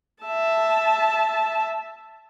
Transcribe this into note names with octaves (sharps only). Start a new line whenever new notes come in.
E5 A5